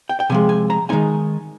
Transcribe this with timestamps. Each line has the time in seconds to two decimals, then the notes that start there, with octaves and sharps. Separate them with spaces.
0.09 G5
0.20 G5
0.30 C3 F3 G#3 G#5
0.49 G#5
0.70 A#5
0.89 D#3 G#3 C4 D#4 G#5